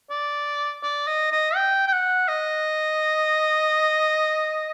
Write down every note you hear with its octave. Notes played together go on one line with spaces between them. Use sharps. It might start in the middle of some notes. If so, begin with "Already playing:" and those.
D5
D5
D#5
D#5
G5
G5
F#5
D#5